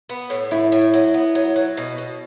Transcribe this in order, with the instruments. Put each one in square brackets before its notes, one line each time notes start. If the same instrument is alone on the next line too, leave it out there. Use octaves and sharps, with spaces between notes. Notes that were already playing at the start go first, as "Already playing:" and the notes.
[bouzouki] B3
A2
[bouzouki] A2 [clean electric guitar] E4
[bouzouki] A2
F#3
B3
F#3
F#3
B2
B2